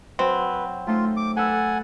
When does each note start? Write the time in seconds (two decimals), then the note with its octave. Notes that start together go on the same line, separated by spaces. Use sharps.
0.19 F#3 C4 B4
0.87 A3 D#4 F4 C5
1.17 D6
1.36 A4 B4 F#5 G#5 E6